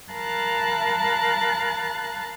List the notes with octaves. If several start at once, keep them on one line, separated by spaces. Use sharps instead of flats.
A#4 F5 A5 B5 F#6 A6